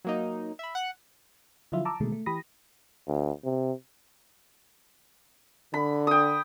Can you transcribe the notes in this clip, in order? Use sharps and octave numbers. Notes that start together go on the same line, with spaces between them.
F#3 A#3 D#4
E5 B5
F#5 F#6
D3 F3 F#3 E4 F4 E5
A5 A#5 D6 E6
B2 D3 D#3 G#3 A3
A3
E3 G4 B5 D#6 A#6
D2
C3
D3 B5
G5 D#6